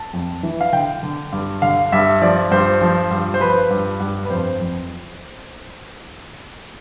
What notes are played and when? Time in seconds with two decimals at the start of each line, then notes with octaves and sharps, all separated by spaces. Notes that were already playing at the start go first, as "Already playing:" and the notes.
Already playing: A5
0.13 F2
0.43 E3
0.61 F5
0.73 D3 G5
1.03 D3
1.32 G2
1.62 D3 F5
1.92 G2 E5
2.22 F3 D5
2.51 G2 C5
2.81 F3
3.11 G2
3.34 C5
3.41 F3 B4
3.70 G2
4.00 G2
4.25 B4
4.30 F2 C5
4.59 F2